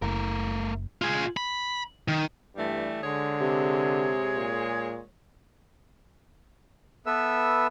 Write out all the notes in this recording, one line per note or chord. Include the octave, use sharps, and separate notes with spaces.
F#1 A3 A#4
F4 G#4
B5
D#3
G2 E3 G3 A3
D3 G#3 G#4 C#5
C3
A#2
B3 A4 B4 E5 E6